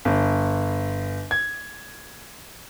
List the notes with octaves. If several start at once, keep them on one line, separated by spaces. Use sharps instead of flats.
G1
G#6